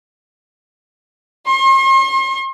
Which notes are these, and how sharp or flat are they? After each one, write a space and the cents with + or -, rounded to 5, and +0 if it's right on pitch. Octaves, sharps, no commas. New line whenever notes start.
C6 +45